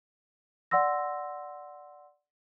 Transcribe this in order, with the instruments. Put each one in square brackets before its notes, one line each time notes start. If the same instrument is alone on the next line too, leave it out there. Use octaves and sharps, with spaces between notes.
[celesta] D5 F#5 C6 E6 A#6